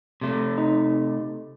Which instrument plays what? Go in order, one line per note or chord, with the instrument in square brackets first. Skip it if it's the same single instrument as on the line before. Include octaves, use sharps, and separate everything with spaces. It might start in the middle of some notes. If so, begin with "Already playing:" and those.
[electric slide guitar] C3 A3
[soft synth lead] D#4